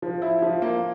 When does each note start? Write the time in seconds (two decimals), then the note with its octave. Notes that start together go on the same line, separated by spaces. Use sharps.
0.02 F3
0.22 E4
0.42 F3
0.62 A#3